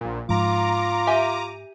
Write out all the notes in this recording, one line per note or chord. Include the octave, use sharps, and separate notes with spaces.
A#1 A#2
G#2 F3 F4 A#5 D6
G4 E5 G#5